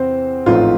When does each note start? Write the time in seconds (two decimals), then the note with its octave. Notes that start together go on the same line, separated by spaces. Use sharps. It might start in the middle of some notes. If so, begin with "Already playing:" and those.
Already playing: E2 C3 C4 C5
0.46 A1 G#2 F3 A3 C4 F4